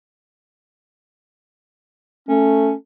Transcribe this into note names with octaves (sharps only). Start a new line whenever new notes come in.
A3 C#4